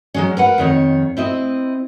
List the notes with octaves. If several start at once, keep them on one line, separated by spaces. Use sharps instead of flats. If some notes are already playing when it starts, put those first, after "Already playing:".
F#3 G#3 C#4
A#4 B4 F#5
F2 D#3 C#5
C4 E4 D#5